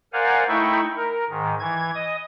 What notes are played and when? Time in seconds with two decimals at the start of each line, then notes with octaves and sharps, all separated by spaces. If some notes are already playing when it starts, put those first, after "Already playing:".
0.13 A#4 C5 D5 F5 F#5 G#5
0.48 A3 D#4 E4 G5 B5 C#6
0.96 A#4
1.30 G#2 D#3
1.59 E3 G#6
1.95 D#5 D#6